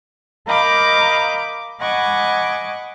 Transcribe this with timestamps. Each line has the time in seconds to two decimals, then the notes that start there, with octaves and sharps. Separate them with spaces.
0.47 A#4 D#5 F5 B5 D6 G6
1.80 D#5 F#5 G#5 B5 C#6 D6